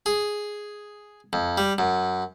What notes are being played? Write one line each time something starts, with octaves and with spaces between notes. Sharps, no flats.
G#4
F2
G3
F#2